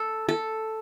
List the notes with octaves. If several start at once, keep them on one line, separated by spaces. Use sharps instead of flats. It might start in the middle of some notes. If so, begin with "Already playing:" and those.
Already playing: A4
A4